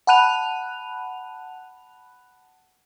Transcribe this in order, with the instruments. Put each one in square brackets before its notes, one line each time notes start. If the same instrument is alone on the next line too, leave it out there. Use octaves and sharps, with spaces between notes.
[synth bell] F#5 A5 B5 F#6 D#7 F7